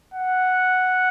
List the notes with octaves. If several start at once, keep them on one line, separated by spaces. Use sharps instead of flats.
F#5